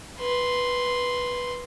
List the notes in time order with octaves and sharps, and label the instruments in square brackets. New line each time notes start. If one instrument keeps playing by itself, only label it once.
[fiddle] B4 C6